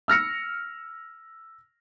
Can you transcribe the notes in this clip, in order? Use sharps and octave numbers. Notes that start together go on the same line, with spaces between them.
E6 F6 A#6 C#7